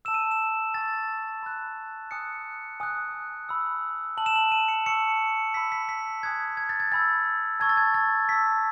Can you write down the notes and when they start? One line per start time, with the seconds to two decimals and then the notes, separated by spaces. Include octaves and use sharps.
0.05 A5 E6 E7
0.14 D#7
0.31 E7
0.74 G#5 C#6 E6 A6
1.43 B5 F#6
2.11 G#5 D#6 F#6 C#7
2.80 G#5 D#6 F#6
3.49 B5 E6
4.17 A5 E6 F#7
4.26 E7
4.36 F#7
4.52 D#7
4.68 C#7
4.86 A5 C#6 E6 C#7
5.54 B5 E6 B6
5.72 B6
5.89 B6
6.23 G#5 D#6 F#6 G#6
6.57 G#6
6.69 A6
6.80 G#6
6.92 G#5 B5 E6 A6
7.60 A5 C#6 E6 G#6
7.69 A6
7.77 G#6
7.94 A6
8.28 A5 E6 B6